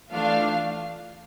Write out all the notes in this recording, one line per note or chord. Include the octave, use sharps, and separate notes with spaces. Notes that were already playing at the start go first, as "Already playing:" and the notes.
E3 A3 D4 F4 F5